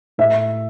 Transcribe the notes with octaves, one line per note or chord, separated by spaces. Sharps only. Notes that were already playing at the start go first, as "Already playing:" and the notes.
A2 E5